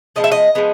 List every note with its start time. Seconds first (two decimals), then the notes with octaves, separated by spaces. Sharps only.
0.16 F3 G#3 B3 D#5
0.24 E5
0.32 D#5
0.55 F3 G#3 B3